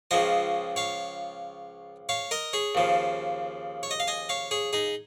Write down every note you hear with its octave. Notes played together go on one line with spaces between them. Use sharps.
C#2 C#3 F3 D#5 G#5
C#5 F5
C#5 F5
A#4 D#5
G#4 C#5
D#2 C#3 F3
C#5
D#5
F5
D#5 G#5
C#5 F5
G#4 C#5
D#4 G#4